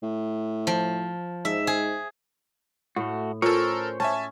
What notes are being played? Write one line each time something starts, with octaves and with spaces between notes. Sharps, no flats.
A2
F3
G#2 E5
G#4
A2 A3 F#4
C#4 F4 A4 A#4 C5 C#5 C#6
C#4 E5 G#5 A5